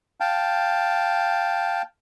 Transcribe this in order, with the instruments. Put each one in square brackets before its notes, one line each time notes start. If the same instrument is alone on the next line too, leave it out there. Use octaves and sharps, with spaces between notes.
[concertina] F5 G5 A5